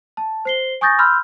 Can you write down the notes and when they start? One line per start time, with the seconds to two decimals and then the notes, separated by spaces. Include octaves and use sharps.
0.17 A5
0.45 C5 C7 G7
0.81 G#5 C#6 D#6 G6 A6 A#6
0.99 B5 C6 E6 F6 G6